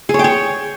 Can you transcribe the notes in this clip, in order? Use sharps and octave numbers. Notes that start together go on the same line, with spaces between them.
G#4
C#5
G5
C#5